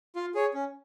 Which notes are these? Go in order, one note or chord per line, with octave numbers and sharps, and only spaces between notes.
F4
G#4 C#5
C#4